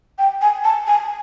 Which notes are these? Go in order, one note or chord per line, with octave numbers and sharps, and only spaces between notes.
G5
G#5
A5
G#5